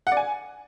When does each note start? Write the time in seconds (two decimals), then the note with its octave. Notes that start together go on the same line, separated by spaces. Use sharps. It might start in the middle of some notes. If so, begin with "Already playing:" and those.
0.07 F#5
0.12 D5
0.17 G#5